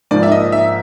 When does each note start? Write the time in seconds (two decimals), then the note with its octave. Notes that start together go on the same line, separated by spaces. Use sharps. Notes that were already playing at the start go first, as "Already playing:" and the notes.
0.11 G#2 F3 A#3 D5
0.23 E5
0.32 D#5
0.52 E5